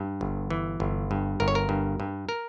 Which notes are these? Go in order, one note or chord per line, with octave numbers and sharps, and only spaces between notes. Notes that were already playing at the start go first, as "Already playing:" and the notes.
Already playing: G2
G1
E3
G1
G2
G1 A#4
C#5
A#4
G2
G2
A#4